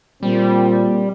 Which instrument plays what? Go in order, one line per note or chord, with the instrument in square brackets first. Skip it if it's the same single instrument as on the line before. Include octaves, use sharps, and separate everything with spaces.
[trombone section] A#2 C4 [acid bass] G3